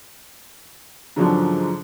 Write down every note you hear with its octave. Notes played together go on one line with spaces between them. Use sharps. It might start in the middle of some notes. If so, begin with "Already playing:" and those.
G#2 D3 F3 F#3 C#4 D4